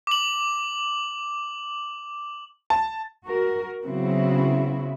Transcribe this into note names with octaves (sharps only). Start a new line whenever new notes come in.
D6 F#7
A5
F#4 A#4
C#3 F#3 B3 C4 E4 F#4